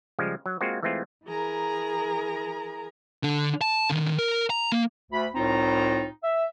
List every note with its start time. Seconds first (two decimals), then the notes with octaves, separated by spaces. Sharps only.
0.19 C#3 F3 G3 G#3
0.46 F#3
0.61 G#3 A#3 C4 F4 F#4
0.83 E3 G#3 A3 C4 F4
1.26 E3 G#4 A#4 A#5
3.23 D3 D4
3.61 A5
3.90 D3 D#3
4.19 A#4
4.50 A#5
4.72 A#3
5.12 D2 B5
5.35 C2 A2 C4 D#4 F4 A#5
6.23 E5